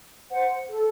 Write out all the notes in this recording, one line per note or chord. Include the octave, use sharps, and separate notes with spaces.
C5 F#5
A4